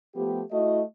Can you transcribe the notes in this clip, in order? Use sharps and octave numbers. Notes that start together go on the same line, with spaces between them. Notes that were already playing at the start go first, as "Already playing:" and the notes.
F3 A3 B3 G4
A3 E4 F#4 D#5